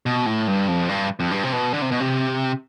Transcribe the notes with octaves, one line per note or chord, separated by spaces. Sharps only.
B2
A2
G2
F2
G2
F2
G2
C3
B2
D3
C3
B2
C3